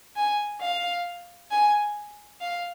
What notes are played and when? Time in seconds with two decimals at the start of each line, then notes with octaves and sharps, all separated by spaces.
0.16 G#5
0.61 F5
1.51 G#5
2.41 F5